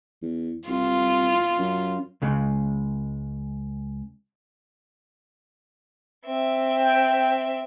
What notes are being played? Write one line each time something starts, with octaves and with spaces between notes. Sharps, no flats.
E2
C2 F4
F#2
C#2 C#3 G#3
C4 E5
G5